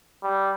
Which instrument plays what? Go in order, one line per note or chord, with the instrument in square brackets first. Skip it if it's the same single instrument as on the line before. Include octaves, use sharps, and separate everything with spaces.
[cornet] G3